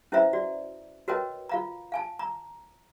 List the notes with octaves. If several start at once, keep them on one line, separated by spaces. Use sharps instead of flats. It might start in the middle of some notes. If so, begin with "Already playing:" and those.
C#4 E4 B4 C5 E5 A#5
F#4 D5
F#4 A#4 B4 C#5 D#5 G5
F4 F5 A#5
F5 G#5 A5
A#5